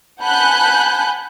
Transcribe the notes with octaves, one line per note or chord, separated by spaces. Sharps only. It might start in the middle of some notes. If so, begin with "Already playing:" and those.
F#5 G#5 A5 B5 F#6 G6